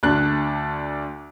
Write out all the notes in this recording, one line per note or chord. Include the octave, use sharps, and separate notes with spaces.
D2 D4 F#6